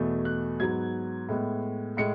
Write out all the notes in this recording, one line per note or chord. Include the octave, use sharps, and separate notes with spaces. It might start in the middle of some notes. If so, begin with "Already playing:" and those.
Already playing: E2 B2 A3
F#6
G#2 F#3 B3 G#6
A2 G#3 B3
A2 G#3 C#7